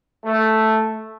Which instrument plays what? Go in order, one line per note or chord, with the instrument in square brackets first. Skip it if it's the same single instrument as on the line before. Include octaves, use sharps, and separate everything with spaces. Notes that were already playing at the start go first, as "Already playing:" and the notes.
[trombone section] A3